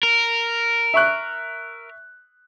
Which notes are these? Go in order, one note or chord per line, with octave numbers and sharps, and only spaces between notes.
A#4
E5 C#6 F#6